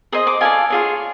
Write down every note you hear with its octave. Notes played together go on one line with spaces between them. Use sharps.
G#4 C5 D#5 D#6
D6
F4 A4 D5 G#5
F4 G#4 C#5